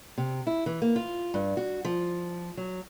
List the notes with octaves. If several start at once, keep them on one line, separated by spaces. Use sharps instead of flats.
C3
E4
E3
A#3
F4
G2
F#4
F3
F#3